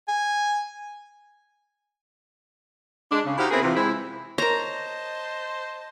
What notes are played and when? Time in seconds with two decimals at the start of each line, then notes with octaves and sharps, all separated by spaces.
0.08 G#5
3.11 G#3 D4
3.25 C#3
3.38 D#4 E4 F#4 G4 C5 F5
3.51 B3 C4 E4 G#4 A#4 B4
3.62 C3 E3 F3
3.75 G#3 C4 E4
4.38 A#4 C5 C#5 D#5 A5 A#5